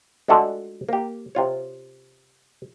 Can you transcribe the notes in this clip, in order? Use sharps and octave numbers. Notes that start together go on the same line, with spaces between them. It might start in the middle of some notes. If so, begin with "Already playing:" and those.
G#3 A3 D4 F4 F#4 A4
A#3 G4
C3 F4 C#5